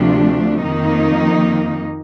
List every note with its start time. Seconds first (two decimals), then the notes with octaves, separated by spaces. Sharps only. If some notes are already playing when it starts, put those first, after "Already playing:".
Already playing: D2 C3 F3 A3 D4
0.64 F2 D#3 A#3 D#4